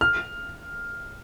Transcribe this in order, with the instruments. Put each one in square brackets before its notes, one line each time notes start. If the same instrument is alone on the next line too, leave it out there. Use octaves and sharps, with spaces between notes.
[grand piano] F6